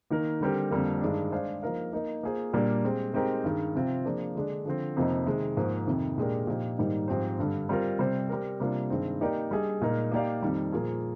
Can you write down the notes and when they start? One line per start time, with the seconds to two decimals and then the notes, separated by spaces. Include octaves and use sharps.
0.10 D#3 A#3 D#4 A#4
0.41 D3 G3 C4 G4 A#4
0.71 F2 D3 G3 A#3
1.01 G2 D#3 G#3 D4
1.32 G#3 D4 G#4 C5 F5
1.63 F3 A#3 D#4 A#4 F5
1.93 A#3 D#4 A#4 D#5
2.23 A#3 F4 G#4 C5
2.53 A#2 G3 A#3 D4
2.84 G#3 C4 G4
3.14 G#3 C4 D#4 G4 A#4
3.44 G2 D#3 G#3
3.75 C3 F3 C4 F4
4.05 F3 A#3 D4 G#4
4.35 D3 G#3 D4
4.65 D3 F3 C4
4.97 F2 C3 F3 A#3 D#4
5.26 C3 D#3 G#3
5.56 G#2 F3 A#3
5.87 F2 C3 D#3
6.18 A#2 G#3 D4 G4 A#4
6.47 A#2 F3 A#3 D#4 G4
6.78 G#2 D#3 G3 A#3 D#4
7.08 G#2 F3 C4 G4 C5
7.39 G2 D3 G3
7.69 G3 C4 F4 A#4
7.99 C3 G3 C4 G4 C5
8.29 G3 C4 G4 A#4
8.60 C3 G3 A#3 D4 F4
8.90 G2 D#3 G#3 C4
9.21 A#3 D#4 G4 A#4 D5
9.51 G3 D4 G#4 D#5
9.82 A#2 G#3 D#4 A#4
10.11 A#3 D#4 G4 D5 F5
10.42 F2 D#3 G3
10.72 A#2 F3 A#3 F4 G#4